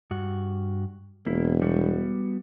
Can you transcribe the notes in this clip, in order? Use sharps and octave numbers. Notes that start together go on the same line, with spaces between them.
G2 F#4
E1 A#3 E4
G3 B3 F#4